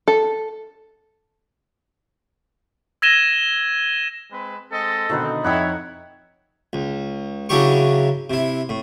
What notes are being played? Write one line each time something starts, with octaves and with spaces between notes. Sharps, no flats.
A4
E6 G#6 A#6 D#7 E7 G7
G#3 C4 B4
G#3 C4 A4 D#5
B2 D3 D#3 A3 C4 D#4 B4
F2 D#4 E4 C#5 F#5 G5 D#6
C#2
C#3 F#3 D4 E4 G4 C#6
C3 E4
A2